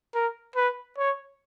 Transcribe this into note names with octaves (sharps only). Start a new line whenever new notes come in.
A#4
B4
C#5